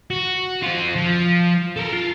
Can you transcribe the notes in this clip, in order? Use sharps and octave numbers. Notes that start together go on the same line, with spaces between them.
F#4
C4 F4
F3
A4 A#4
F4